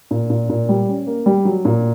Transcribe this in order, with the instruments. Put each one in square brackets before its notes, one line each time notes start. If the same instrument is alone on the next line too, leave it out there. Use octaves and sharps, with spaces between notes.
[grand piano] A#2
A#2
A#2
G3
C#4
A#3
G3
F#3
A#2